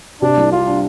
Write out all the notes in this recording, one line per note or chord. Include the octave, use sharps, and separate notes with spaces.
C3 D4
C2
G3 F4
D4